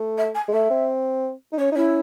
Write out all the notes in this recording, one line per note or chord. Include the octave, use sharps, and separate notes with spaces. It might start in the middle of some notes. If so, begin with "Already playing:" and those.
Already playing: A3
E5
G#5
G#3
A3 E5
C4
D#4
C#4 C#5
D#4
C#4 E4